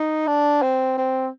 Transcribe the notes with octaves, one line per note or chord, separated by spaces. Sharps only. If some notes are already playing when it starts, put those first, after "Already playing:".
Already playing: D#4
D4
C4
C4